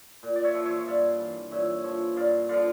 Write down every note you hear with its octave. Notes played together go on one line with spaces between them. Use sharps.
A#2
D5
C#5 E5
F3
C#5 E5
E5
G2 D5 F5
E3
A#2 C#5 E5
F3 C#5 E5
G2 D5 F5
D3 F3 D5 F5